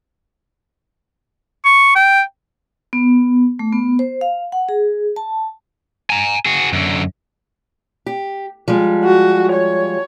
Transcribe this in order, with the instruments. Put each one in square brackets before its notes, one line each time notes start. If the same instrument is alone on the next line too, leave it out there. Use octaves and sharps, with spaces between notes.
[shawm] C#6
G5
[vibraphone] B3
A3
B3
C5
F5
F#5
G#4
A5
[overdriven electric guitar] G#5 A#5
F#4 G#4
F#2 D3
[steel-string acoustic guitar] G4
F3 G3 G#3
[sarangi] F#4
C#5